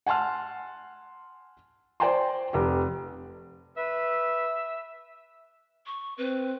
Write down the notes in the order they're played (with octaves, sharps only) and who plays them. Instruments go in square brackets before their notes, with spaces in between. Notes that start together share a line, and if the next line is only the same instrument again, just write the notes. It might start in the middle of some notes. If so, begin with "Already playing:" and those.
[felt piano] F#5 G#5 A5 C6 F6
C5 D5 G5 G#5 A#5 C6
F1 G4
[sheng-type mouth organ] B4 [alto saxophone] E5
[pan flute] C#6
[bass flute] C4 [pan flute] B4